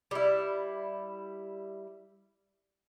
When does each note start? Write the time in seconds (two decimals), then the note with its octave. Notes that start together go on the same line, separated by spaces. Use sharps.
0.11 G3 E4